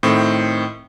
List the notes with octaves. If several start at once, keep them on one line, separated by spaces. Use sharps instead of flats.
A2 D#3 C4